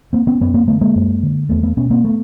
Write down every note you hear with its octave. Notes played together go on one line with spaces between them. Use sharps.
A#3 C4
B3 C#4
F#2 B3 C#4
A#3 C4
D3 A3 B3
G#3 A#3
F#2
D3
E2 A3 B3
A3 B3
B2 B3 C#4
A#3 C4
A3 B3